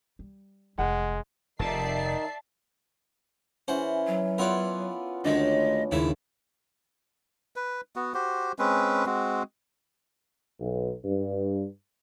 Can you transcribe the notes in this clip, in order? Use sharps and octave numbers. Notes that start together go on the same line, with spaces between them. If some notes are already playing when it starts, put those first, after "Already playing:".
G3
F1 D#3 G#3 F#5
F1 C3 D#3 D#4 D5 E5 A5 C7
E3 C#4 C5 F#5
F#3
B3 F4 A#4 C#5 D5 E5
D2 D#3 G#3 D4 C#5 D#5
D#2 G#2 C#3 E4 E5
B4
B3 F#4
F#4 G4 C5
G#3 C4 C#4 B4
G#3 C4 F#4
B1
G2